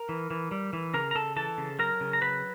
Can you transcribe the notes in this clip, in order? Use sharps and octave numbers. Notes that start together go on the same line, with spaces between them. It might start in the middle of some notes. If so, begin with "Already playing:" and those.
Already playing: A#4 A#5
E3
E3
G3
E3
C#3 A#4 A#5
A#5
C#3 A4 A5
E3 A4 A5
C#3
F#3 A#4 A#5
C#3
A#5
F#3 B4 B5